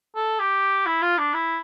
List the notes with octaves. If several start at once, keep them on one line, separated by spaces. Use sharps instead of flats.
A4
G4
E4
F4
D4
E4